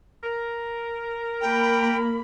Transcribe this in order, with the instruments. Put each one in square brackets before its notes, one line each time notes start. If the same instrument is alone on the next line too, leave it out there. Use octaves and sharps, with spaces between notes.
[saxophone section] A#4
[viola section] A#3 B5 [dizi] G5